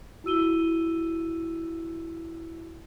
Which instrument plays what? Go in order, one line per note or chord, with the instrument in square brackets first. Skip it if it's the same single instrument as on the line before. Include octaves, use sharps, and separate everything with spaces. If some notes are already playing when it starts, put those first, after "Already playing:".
[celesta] E4 F#4 E6 D#7 G7